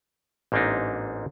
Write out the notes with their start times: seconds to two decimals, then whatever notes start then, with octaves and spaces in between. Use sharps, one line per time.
0.52 A1 G#2 A#3 C4 D4 D#4